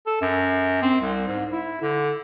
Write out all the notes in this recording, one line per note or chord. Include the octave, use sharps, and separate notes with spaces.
A4
F#2
C4
C2
G#2
E4
D3